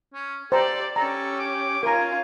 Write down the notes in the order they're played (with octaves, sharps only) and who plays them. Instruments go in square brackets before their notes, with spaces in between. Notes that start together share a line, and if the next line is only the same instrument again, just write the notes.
[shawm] C#4
[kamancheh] G4 D5 [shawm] A4 [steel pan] C5 A#5
[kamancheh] C#4 G4 [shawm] A4 [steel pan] A#5
[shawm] D6
[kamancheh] C#4 F4 [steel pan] A#4 A#5 [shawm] G#5